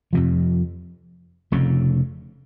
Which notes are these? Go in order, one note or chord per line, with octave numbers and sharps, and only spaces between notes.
F2 C3 F3
F1 F2 C#3